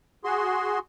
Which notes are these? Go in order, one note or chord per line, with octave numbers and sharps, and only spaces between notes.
F#4 G#4 C6